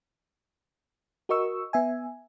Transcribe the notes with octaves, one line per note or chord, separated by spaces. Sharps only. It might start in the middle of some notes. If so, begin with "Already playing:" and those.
F#4 A#4 D#5 C#6 E6
B3 E5 G#5